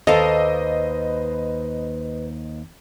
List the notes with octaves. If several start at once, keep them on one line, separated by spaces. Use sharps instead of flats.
D#2 A4 B4 C5 D5 D#5 F5